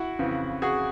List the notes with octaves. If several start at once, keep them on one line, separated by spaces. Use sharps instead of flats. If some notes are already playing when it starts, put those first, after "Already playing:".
Already playing: E4 F#4
F2 C#3 E3
F#4 G#4